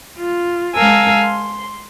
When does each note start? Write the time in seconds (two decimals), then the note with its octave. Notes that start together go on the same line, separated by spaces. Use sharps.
0.18 F4
0.74 G#3 A#4 F5 G#5 A5 E6
1.23 C6